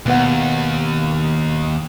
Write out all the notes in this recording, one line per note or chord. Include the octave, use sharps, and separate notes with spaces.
D#2 B2 B3 F#5